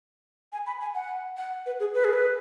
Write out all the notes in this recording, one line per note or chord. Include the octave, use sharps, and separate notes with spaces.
G#5
B5
G#5
F#5
F#5
B4
G#4
B4
G#4
B4